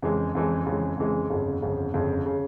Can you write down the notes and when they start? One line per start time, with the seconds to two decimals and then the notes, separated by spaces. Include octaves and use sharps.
0.02 F2 C#3 E3 G#3
0.35 F2 C#3 E3 G#3
0.66 F2 C#3 E3 G#3
0.98 F2 C#3 E3 G#3
1.30 G1 F2 C#3
1.62 G1 F2 C#3
1.94 G1 F2 C#3
2.26 C#3